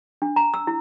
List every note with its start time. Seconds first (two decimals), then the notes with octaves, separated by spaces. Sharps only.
0.22 D4
0.36 A#5
0.54 E6
0.67 E4